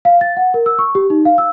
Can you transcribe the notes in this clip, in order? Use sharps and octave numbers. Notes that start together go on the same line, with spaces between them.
F5
A6
F#5
A#4
E6
C#6
G4
D#4
F5
E6